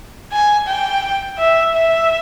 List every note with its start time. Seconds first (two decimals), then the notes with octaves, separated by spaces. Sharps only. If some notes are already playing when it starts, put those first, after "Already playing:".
0.32 G#5
0.67 G5
1.38 E5
1.74 E5